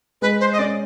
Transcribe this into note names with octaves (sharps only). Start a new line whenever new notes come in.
G#3 B4
C5
D#5
C#4 D5